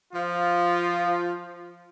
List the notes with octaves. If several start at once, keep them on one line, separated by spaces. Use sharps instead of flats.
F3 F4